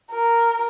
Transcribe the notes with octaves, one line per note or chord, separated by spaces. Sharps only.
A#4